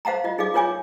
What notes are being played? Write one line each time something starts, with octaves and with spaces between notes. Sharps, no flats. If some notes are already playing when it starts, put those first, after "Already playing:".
C5 F5 F#5 A5 A#5
F4 D#5
D#4 G#4 D5 F5 D6
F4 A#4 C#5 G#5 D6